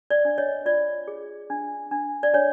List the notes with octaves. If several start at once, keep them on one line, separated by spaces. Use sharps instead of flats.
D5
D4
C#5 D#5
F4 D5
G#4
D4
D4
D5
D4 C#5